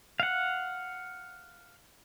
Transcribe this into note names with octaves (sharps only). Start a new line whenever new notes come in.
F5 F#5